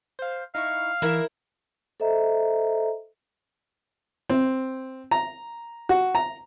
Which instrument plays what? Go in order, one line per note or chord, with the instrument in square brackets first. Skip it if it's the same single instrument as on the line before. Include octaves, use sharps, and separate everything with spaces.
[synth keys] C5 F5
[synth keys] D#4 E4 C#6 [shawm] F5
[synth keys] E3 [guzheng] E4 A#4 E5
[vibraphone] A4 C5 D#5 E5 A#5
[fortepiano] C4
A#5
F#4
A#5